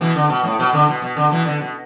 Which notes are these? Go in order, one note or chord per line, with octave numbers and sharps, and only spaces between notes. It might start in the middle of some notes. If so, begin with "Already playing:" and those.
B2 E3
D3
B2
A2
B2
D3
B2
B2
D3
B2 E3
D3
B2